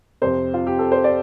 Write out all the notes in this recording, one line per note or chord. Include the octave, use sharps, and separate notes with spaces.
F2 C3 C5
F4
G4
A4
C5
D5